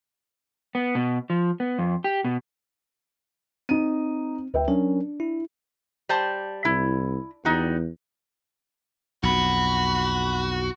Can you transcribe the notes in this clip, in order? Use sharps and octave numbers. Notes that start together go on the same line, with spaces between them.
B3
B2
F3
B3
F2
G4
B2
C4 D#4 D#7
D2 B4 E5 G5
F#3 C#4 D4 A#4
E4
G3 C5 A5
C2 E4
E2 G3 D#4 F#4
B1 F2 F#4 B5